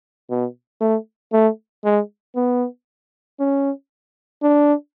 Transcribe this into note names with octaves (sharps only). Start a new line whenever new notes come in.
B2
A3
A3
G#3
B3
C#4
D4